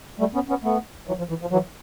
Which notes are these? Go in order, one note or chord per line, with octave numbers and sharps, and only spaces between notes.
G3 A3
B3 C#4
B3 C#4
A3 B3
E3 F#3
F3
E3
F3
E3 F#3